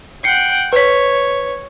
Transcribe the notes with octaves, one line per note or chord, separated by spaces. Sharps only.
F#5 G5 C7 C#7
B4 C#5 B6